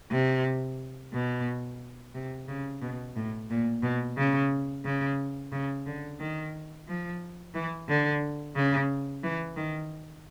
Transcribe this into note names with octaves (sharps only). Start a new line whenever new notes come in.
C3
B2
C3
C#3
B2
A2
A#2
B2
C#3
C#3
C#3
D3
D#3
F3
E3
D3
C#3
E3
D#3